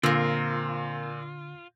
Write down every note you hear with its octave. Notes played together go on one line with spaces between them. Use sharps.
A#2 D3 C4 F4 A#4